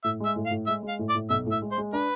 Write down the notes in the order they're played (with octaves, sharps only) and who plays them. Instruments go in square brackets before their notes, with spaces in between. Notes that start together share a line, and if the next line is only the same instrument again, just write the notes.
[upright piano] A2 [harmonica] E5
[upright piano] G#3 [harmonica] E5
[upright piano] A2
[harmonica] F5
[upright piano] A2
[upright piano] G#3 [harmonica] E5
[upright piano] G#3
[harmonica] F5
[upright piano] A2
[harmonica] D5
[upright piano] A2
[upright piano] B1 [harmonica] E5
[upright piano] A2
[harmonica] E5
[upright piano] G#3
[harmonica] C5
[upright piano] G#3
[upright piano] D4 [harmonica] B4